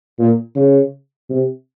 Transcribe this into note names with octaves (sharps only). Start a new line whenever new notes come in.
A#2
C#3
C3